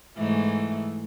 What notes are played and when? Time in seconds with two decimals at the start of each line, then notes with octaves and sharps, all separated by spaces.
0.17 G#2 E3 A3